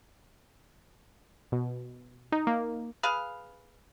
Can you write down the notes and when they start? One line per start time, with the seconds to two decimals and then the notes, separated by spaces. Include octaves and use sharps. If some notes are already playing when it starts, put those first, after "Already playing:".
1.52 B2
2.32 D#4
2.47 A#3
3.03 G#4 B4 F5